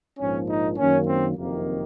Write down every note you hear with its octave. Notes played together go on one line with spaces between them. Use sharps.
A#1 G#2 F3 A#3 C#4
D#4
F#2 D#3 A#3 C#4
C4
F#1 F2 C3 D#3 A#3